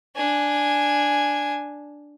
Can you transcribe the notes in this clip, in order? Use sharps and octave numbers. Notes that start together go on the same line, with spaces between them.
D4 G#5